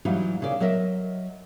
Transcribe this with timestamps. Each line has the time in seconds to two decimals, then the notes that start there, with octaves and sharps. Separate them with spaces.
0.05 E3 F#3 G3 D#4 F4
0.40 A#2 C#3 D5
0.60 F#3 A#4 D#5 E5